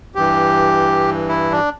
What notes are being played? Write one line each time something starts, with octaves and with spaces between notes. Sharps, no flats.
G2 E3 G4
E4
D4